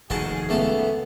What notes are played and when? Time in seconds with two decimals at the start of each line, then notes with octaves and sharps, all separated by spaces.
0.10 F1 D#2 D#3 F#4 G#4 D#5 A5
0.49 C#2 A3 B3 A5